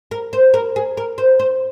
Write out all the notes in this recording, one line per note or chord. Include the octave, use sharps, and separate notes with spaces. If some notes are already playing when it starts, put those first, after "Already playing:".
A#4
C5
A#4
G#4
A#4
C5
C5